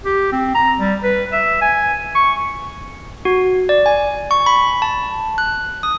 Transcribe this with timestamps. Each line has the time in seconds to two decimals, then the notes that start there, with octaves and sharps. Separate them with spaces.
0.05 G4
0.32 C4
0.55 A#5
0.78 G3
1.04 B4
1.33 E5
1.61 G#5
2.15 C#6
3.25 F#4
3.69 D5
3.86 G#5
4.31 C#6
4.46 B5
4.82 A5
5.38 F#6
5.83 D#6